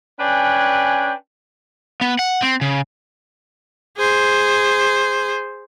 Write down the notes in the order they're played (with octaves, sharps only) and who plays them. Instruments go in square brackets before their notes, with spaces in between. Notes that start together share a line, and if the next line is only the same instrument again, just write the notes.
[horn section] C#4 D4 B4 G5 G#5
[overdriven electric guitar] B3
F#5
C4
C#3
[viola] G#4 C5